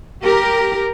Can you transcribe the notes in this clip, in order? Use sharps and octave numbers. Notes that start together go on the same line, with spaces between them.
G4 A#4